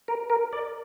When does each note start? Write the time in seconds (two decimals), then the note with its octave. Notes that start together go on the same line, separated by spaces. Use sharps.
0.08 A#4
0.30 A#4
0.53 D5